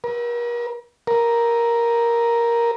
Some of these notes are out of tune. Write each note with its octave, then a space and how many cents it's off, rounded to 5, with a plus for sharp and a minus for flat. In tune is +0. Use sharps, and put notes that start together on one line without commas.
A#4 +40
A#4 +5